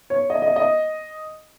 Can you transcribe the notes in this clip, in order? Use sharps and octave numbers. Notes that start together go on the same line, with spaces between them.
C#5
D#5
D#5
D#5